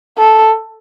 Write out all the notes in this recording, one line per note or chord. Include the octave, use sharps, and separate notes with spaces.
A4